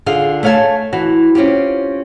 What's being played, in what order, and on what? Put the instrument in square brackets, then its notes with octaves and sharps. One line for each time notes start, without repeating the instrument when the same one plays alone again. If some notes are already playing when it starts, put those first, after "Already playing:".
[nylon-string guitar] D3 F4 G#4 F5
A3 C#5 F5 F#5 G#5 A5
E3 F#4
C4 C#4 F4 G4